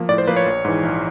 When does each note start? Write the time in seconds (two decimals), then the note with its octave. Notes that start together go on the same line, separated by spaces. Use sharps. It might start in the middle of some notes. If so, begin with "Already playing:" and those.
Already playing: F3 A#3
0.09 A2 D5
0.18 C5
0.27 F3 A#3 B4
0.37 C#5
0.46 A#1
0.65 G#2 E3
0.83 A#1